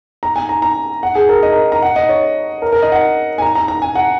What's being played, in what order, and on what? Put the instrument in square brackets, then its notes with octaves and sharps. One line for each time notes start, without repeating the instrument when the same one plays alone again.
[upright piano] A#5
G#5
A#5
A#5
F#5
G#4
A#4
D#5
A#4
A#5
F#5
D#5
C#5
A#4
A#4
D#5
F#5
G#5
A#5
A#5
A#5
G#5
F#5